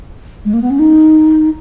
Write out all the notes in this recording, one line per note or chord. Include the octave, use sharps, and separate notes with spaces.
G#3
A#3
B3
C#4
D#4